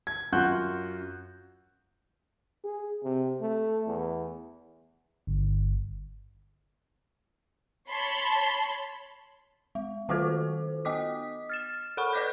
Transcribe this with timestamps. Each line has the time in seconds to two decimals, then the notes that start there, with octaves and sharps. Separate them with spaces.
0.07 G#6
0.32 F#2 F4 F#4 F#6 G6
2.64 G#4
3.04 C3
3.41 A3
3.87 E2
5.27 G1
7.90 C#5 A5 B5 C6
9.75 G#3
10.09 D#3 A3 F4 F#4 A4 C5
10.85 B3 D#5 D6 D#6 B6
11.49 F6 A6 E7
11.97 A4 A#4 F#5 B5 C#6
12.13 B4 D5 D#5 D6 F#6 G6